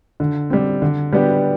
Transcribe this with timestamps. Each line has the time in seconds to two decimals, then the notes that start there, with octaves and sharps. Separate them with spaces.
0.20 D3
0.50 G3 C4
0.82 D3
1.13 G3 B3 D4 G4